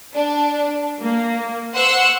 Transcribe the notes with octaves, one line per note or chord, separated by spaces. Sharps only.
D4
A#3
C5 F#5 C6 C#6 E6 F#6